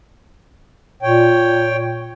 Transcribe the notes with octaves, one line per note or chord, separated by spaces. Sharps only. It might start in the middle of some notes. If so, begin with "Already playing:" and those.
A#2 C#5 G5